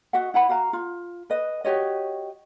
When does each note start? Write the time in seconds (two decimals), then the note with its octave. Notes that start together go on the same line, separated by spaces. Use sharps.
0.13 F#4 D#5 E5 F#5
0.34 E4 F#5 B5
0.49 F#4 F5 A#5
0.73 F4
1.30 B4 D#5
1.65 F#4 G4 C#5 D#5